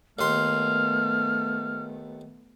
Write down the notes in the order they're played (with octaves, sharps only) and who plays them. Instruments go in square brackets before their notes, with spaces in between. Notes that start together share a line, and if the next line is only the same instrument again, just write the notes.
[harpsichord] D#2 C6 [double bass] A3 B3 [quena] F6